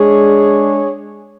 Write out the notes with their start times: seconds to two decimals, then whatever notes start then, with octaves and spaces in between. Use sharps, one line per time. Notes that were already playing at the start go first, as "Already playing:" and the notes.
Already playing: G#3 D4 G#4 C#5